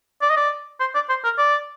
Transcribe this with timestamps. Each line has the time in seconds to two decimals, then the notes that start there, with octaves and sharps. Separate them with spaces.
0.22 D5
0.30 D#5
0.37 D5
0.80 C5
0.95 D5
1.09 C5
1.24 A#4
1.38 D5